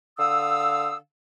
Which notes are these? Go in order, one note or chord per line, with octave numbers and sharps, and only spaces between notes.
D3 F5 D#6 E6